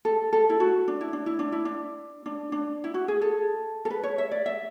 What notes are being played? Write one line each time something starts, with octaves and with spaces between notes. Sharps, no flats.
A4
A4
E4
F#4
D4
E4
D4
E4
D4
E4
D4
D4
D4
E4
F#4
G#4
A4
A4
B4
C#5
E5
D5
E5